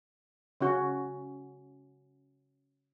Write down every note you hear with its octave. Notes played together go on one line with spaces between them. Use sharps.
C#3 C#4 F#4